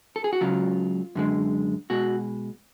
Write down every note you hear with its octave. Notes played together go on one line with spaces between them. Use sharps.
A4
G#4
F#4
C#2 C#3 F#3 F4
F#2 D3 G#3
B2 G#3 F#4